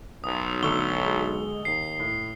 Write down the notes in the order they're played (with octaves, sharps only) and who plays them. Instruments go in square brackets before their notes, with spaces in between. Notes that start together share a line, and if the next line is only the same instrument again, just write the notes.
[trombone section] B1 [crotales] D#6
[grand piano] D3 C#6 E6 [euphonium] A3 [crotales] G7
[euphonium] G#3
[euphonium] D#2 [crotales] C7
[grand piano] A2